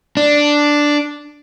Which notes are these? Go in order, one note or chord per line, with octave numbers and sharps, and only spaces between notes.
D4